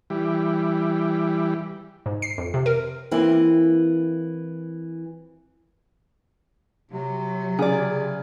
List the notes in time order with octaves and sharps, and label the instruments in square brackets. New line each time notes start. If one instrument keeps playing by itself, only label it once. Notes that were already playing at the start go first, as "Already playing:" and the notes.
[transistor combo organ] E3 G3
[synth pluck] G#2
C7
F2
C3
A#4
[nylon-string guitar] E3 A#3 C4 E4
[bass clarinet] C3 [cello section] F#3
[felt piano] C#3 [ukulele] G#4 D5